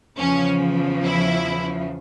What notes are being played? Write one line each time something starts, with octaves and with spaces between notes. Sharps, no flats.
E2 C#3 F3 C#4
E4